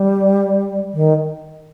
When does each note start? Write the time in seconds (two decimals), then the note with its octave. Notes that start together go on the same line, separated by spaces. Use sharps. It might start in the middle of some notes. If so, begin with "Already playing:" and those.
Already playing: G3
0.94 D#3